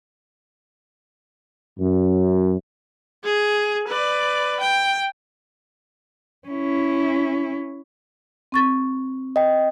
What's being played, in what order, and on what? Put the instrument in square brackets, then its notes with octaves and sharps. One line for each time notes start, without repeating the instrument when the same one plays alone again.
[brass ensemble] F#2
[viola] G#4
B4 D5
G5
[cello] C#4 E4
[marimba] C4 C#6 A6
[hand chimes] D#5 G5